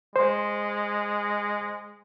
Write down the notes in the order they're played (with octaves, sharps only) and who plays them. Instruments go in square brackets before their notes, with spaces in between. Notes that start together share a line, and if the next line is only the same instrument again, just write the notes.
[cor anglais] G#3 [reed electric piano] C5